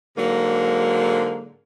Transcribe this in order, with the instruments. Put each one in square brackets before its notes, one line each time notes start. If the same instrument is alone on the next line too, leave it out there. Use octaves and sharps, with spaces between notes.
[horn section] G#2 D3 F#3 A#3